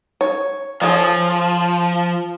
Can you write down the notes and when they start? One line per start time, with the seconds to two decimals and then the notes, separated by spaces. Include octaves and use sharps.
0.21 C#5
0.82 F3 G#4 A4 C#5